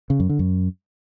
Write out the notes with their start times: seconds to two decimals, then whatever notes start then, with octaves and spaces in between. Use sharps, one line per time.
0.10 C#3
0.20 F#2
0.29 D3
0.39 F#2